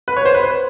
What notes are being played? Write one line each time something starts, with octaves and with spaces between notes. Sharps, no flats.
B4
C#5
C5
B4